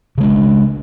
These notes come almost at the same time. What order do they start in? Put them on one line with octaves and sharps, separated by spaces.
C#3 G#3 D4